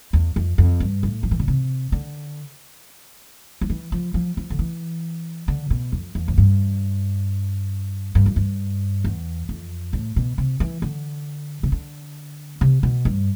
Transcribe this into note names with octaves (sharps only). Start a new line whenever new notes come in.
E2
F2
F2
G2
A2
F3
E3
D3
C3
D3
F3
E3
F3
F3
F3
D3
E3
D3
B2
F2
E2
A2
G2
G2
F2
G2
E2
F2
A2
B2
C3
E3
D3
C3
D3
C3
B2
G2